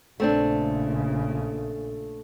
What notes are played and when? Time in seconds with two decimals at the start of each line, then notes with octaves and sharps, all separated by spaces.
0.20 A#1 C#3 A3 C4 D4